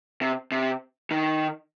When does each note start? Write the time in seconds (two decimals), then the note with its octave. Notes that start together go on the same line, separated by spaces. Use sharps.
0.22 C3
0.52 C3
1.11 D#3